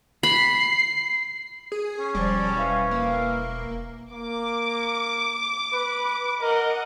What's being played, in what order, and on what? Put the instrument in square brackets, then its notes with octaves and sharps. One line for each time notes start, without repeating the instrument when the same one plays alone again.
[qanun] B5 [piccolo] C7
[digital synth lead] G#4
[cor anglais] C#4
[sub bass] E1 [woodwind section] F3 D5 [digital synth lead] G3
[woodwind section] E4 B4 F5
[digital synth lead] A#3
[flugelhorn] A#3 [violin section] D6
[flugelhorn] B4
[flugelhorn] A#4 [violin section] D#5 F#5